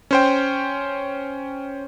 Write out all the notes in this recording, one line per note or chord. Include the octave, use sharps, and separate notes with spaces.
C#4 C5 G5